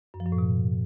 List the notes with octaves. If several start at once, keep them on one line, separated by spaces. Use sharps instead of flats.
F#2
F3
F#2
A2
B2